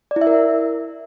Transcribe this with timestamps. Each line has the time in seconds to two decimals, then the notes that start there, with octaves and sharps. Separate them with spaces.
0.11 D5
0.16 E4
0.21 E5
0.27 A#4